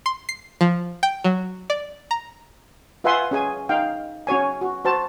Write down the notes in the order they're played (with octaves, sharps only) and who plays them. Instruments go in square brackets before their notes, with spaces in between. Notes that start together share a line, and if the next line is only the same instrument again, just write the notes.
[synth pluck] C6
C7
F3
G5
F#3
D5
A#5
[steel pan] F4 B4 E5 F#5 G#5 C6
C#4 G#4 G#5
D#4 F5 G5
C#4 F#4 C#5 G#5
F#4
F#4 C5 A5